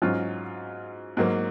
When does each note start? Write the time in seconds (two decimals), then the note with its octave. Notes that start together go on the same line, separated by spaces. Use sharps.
0.02 G#2 F#3 C#4 F4
1.17 G#2 F#3 A#3